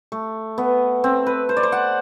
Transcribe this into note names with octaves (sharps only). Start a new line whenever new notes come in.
A3
B3
C4
B4
C5
D5
C5
F#5